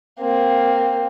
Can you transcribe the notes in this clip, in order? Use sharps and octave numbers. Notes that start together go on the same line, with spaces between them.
A#3 C4